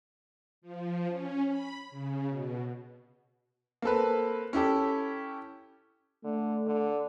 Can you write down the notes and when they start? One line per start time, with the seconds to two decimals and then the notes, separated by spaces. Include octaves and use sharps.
0.62 F3
1.08 C#4
1.48 B5
1.90 C#3
2.29 B2
3.82 A#3 C4 A4 B4
4.53 C#4 E4 G4 A4
6.24 D3 A3
6.66 D3